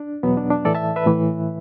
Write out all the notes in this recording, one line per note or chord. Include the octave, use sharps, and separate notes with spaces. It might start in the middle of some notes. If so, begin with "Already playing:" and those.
Already playing: D4
E2 B2 F#3 B3
D4
D4
A2 E3 A4 D5
E5 A5
B4 E5
A2 E3